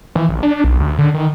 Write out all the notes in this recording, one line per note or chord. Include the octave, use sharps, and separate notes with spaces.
E3
A#1
D4
B1
D2
D3
D#3